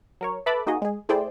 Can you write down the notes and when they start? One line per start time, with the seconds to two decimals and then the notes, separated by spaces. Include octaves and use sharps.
0.21 F#3 A#4 C#5
0.46 A4 B4 E5 A5 B5 D6
0.66 A#3 D#4 F#4 G#4 D#5
0.82 G#3 G#4
1.09 A3 E4 G#4 C5 D5 G5